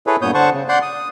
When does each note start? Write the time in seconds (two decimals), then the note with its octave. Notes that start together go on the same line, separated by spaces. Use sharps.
0.07 E4 G#4 A4 B4 C#5
0.22 G2 A#2 B3 C#5 D#6 G6
0.34 D3 C5 F#5 A5 C#6
0.53 C#3
0.69 D5 F#5 C6 G6
0.82 D#6